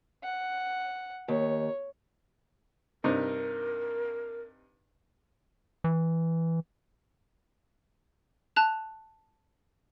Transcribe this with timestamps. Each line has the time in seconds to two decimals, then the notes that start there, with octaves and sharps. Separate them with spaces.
0.23 F#5
1.28 D#2 C#5
3.04 G2 C3 D#4 A#4
5.84 E3
8.56 A5 F#6 F7